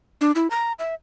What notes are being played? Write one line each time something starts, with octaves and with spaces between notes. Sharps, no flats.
D4
E4
A#5
E5